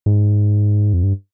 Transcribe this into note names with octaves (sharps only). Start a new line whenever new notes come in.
G#2
F2
G2